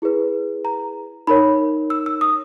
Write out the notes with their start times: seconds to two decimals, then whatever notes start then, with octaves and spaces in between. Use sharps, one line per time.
0.02 E4 G#4 B4
0.65 A#5
1.27 D#4 A#4 C#5 B5
1.90 E6
2.06 E6
2.21 D#6